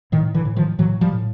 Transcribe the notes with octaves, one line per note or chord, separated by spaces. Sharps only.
A2 D#3
D3 E3
A2
D#3 F3
A2 E3 F#3
F3 G3
A2